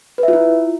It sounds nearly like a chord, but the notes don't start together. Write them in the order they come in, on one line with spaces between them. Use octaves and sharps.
B4 E5 F4 E4